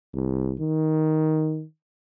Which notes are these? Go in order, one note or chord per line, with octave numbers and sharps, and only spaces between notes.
C2
D#3